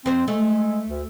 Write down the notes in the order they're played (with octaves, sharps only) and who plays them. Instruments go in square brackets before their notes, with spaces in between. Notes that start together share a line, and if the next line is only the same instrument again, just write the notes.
[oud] F2 C5 [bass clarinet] C4
[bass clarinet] G#3 [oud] A3
[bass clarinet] D2